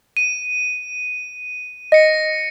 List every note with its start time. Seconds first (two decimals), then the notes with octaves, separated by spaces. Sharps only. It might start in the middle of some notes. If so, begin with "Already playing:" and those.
0.17 D#7
1.92 D#5 A#6 C#7